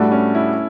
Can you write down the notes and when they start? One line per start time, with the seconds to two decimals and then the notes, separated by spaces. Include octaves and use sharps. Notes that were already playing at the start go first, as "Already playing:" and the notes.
Already playing: A2 G3 A3 D4 F#4
0.12 C#4
0.35 E4